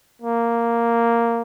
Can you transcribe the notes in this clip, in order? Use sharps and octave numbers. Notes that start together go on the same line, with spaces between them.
A#3